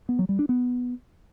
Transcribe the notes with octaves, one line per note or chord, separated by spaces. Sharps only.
B3
F#3
G3
D4
B3